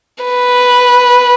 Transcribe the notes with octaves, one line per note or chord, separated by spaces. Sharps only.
B4